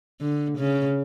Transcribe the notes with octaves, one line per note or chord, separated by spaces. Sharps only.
D3
C#3